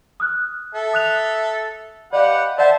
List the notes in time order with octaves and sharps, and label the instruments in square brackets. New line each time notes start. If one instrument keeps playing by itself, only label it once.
[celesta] D#6 F6 F#6
[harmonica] A4 E5
[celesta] D#6 F#6 F7
[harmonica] G4 B4 F#5 [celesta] D5 D#5 F5
[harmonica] C5 E5 A5 [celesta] D5 F#5